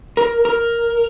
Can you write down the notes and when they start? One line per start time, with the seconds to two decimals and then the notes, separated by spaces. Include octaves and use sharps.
0.17 A#4
0.45 A#4